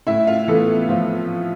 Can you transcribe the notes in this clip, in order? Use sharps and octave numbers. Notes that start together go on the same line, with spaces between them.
A2 E4 E5
F4 F5
E3 A3 B3 A4
A2 F3 F4